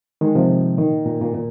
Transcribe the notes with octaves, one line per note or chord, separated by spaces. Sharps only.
D#3 G#3
C3 F3
A#2 D#3
A#2
A#2
A#2